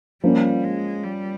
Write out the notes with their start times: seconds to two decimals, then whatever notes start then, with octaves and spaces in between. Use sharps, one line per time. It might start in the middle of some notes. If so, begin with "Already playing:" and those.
0.23 F3 G3 A#3 C#4
0.64 G#3
1.04 G3